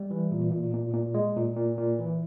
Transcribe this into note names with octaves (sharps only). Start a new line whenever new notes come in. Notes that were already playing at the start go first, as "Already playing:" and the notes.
Already playing: G3
E3
A#2
A#2
A#2
A#2
G#3
A#2
A#2
A#2
E3